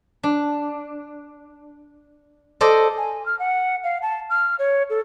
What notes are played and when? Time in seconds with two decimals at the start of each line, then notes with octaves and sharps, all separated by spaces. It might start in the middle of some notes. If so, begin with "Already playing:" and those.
0.23 D4
2.61 A4 C5 D5 D#5
2.97 G#5
3.26 F6
3.39 F#5
3.84 F5
4.02 A5
4.30 F6
4.59 C#5
4.90 A4